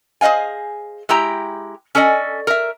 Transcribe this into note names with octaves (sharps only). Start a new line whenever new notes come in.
G#4 C5 D#5 F5 G#5
G#3 E4 G4 G5 A#5
C#4 A4 D5 D#5 G#5
A#4 E5